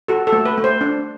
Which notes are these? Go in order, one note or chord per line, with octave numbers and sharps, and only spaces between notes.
F#4 A4
A4
A3
B4
A3
C5
D4